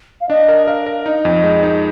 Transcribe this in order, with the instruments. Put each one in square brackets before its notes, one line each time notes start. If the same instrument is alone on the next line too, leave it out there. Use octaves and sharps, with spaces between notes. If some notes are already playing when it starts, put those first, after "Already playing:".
[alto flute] F5
[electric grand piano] D4 [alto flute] D#5
[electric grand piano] A#4
[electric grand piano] A#4 [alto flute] F5
[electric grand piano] A#4
[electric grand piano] D#4 [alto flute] D#5
[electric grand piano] F2
G#3
D#4